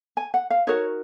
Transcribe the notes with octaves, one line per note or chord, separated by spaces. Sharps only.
G#5
F#5
F5
D#4 F#4 A#4 C#5